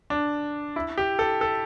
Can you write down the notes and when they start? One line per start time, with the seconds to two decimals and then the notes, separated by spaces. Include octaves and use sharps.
0.10 D4
0.76 E4
0.98 G4
1.19 A4
1.41 A4